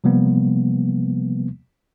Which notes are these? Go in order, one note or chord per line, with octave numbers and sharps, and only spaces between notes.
C3 F3 G3 A#3 B3